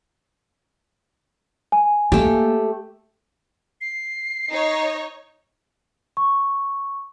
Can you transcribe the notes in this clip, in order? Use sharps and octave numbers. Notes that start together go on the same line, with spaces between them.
G#5
A3 A#3 G4
C7
D#4 C#5
C#6